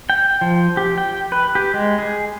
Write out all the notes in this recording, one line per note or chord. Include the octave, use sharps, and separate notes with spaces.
G5
F3
G4
G5
B4
G4
G#3
G#4